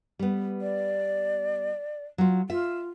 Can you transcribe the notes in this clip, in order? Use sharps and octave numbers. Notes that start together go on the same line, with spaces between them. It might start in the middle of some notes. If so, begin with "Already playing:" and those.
G3 B3
D5
F#3 F4
F4 E5